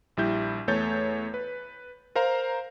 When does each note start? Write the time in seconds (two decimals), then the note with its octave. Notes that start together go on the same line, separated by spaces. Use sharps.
0.17 A#1 G3 E4 G6
0.68 E2 A3 C#5 G6 A6
1.34 B4
2.15 A#4 C5 F5 A#5